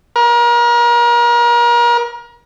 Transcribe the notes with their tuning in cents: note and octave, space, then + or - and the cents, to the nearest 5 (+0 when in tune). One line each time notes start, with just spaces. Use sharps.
A#4 +35